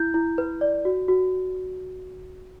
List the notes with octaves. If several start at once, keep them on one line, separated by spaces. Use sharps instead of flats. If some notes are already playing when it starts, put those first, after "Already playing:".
Already playing: E4 G6
E4
B4
D5
F#4
F#4